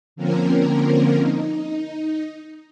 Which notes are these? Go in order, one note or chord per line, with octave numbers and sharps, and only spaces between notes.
D3 F3 A#3 C4 C#4 A#4
D#4